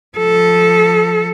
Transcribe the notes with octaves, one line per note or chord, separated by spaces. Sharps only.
F3 A4